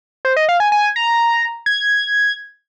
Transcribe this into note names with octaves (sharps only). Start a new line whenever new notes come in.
C5
D#5
F5
G#5
G#5
A#5
G#6